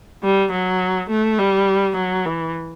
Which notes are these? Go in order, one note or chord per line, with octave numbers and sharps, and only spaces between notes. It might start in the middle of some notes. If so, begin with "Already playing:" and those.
G3
F#3
A3
G3
F#3
E3